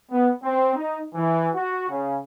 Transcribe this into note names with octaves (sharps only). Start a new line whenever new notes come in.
B3
C4
D#4
E3
F#4
C#3